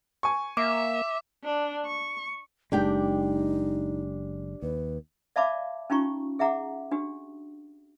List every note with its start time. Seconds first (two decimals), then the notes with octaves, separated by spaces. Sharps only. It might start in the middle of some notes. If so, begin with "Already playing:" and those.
0.23 G#5 C#6
0.57 A#3 E5 D6
1.44 D4
1.87 C#6
2.72 F#1 G#3 D4 D#4 G4 G5
4.62 D#2 B4
5.36 D5 E5 F5 A5 B5 D6
5.90 C#4 D#4 F4 G4 A#5 C#6
6.39 G#4 E5 F#5 A#5 D6
6.91 D4 F#4 G4